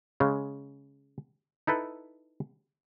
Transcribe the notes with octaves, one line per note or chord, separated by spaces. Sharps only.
C#3 G#3
D#4 E4 A4 B4